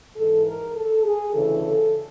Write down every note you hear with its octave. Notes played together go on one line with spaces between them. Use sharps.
G#2 E3 A4
A#4
A4
G#4
D2 C#3 E3 A4